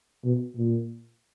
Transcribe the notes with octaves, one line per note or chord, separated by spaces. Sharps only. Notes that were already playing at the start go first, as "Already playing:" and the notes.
B2
A#2